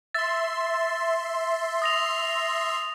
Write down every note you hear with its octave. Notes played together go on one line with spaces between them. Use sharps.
E5 C6 A6
D#6 A#6 F7